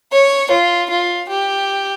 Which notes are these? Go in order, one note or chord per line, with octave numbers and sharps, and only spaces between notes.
C#5
F4
F4
G4